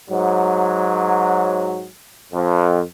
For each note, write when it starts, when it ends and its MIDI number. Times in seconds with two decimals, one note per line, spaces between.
0.11 1.87 44
0.11 1.87 54
2.33 2.81 41